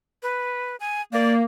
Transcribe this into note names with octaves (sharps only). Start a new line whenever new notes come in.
B4
G#5
A#3 D5